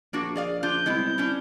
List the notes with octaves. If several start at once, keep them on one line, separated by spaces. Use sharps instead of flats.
A#1 A#3 D4 F#4
G#4 D5 F5
D4 F4 G6
C2 G#3 B3 E4
C#4 D4 E4